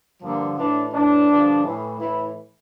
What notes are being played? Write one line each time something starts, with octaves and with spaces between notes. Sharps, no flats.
G2 D3 F3 A#3
A2 E3 D4
A2 E3 D4
G2 D3 F3
A2 E3
A2 E3 E4